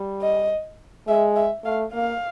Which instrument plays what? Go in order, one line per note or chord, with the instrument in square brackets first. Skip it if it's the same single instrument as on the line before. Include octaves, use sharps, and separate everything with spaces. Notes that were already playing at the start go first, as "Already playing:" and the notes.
Already playing: [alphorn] G3
[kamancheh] D#5
[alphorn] G#3 [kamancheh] E5
[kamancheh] E5
[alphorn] A3 [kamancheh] F5
[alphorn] A#3 [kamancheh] F5